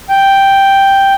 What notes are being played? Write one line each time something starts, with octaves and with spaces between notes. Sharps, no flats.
G5